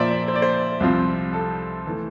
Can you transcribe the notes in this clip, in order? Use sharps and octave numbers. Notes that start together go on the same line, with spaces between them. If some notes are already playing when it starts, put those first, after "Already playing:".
Already playing: A#2 F3 A#3 C5 D5 E5
D5
C5
D5
C5
C2 C3 F3 C4 F4
A4
E3 A3